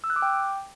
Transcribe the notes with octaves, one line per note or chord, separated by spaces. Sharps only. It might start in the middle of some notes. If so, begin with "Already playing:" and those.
E6
F#6
D6
G5